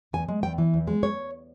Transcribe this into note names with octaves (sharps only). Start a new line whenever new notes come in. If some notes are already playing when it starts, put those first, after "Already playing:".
E2 G#5
G#3
E2 G5
E3
E2
G#3
C#5